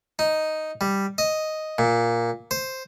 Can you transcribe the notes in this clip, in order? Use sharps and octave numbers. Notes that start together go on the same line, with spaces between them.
D#4
G3
D#5
A#2
C5